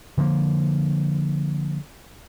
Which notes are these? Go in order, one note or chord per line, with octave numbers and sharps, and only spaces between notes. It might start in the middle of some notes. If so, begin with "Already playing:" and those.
D3 F3 A#3